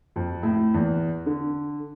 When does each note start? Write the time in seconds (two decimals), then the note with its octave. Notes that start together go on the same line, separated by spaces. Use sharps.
0.16 F2
0.43 A2
0.74 E2
1.26 D3